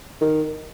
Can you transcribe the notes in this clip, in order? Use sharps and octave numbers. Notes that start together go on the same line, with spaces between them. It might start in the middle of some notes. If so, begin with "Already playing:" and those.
D#3